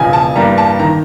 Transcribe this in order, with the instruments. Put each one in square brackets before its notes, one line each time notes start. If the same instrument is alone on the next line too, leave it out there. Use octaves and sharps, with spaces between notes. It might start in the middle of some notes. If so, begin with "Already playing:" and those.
Already playing: [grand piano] E1 E2 C#3 F3 G#5
A5
G2 E3 G3 A#3 A#5
A5
D#3 A#5